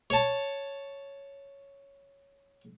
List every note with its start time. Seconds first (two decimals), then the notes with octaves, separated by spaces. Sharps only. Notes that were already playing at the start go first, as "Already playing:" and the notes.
0.10 C#5 A5